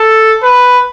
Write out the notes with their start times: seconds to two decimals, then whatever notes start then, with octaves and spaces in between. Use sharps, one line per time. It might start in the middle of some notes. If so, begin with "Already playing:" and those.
Already playing: A4
0.43 B4